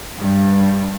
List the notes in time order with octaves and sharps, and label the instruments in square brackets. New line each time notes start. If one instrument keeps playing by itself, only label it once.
[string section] G2